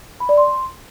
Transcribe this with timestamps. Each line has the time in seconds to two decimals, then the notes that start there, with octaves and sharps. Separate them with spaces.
0.20 B5
0.29 D5
0.38 C6